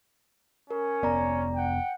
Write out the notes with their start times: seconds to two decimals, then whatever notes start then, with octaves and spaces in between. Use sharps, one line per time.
0.70 C#4 A#4
1.03 F1 B3 D5 A#5
1.55 F#5 G5